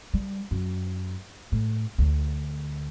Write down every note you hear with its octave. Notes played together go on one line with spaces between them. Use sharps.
G3
F#2
A2
D2